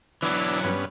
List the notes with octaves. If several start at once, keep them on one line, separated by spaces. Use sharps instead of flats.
E3 F#3 B3 D4 E4
G2 B3 C#4